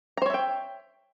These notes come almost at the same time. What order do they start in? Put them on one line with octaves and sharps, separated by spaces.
A#5 C5 C#5 E5 G5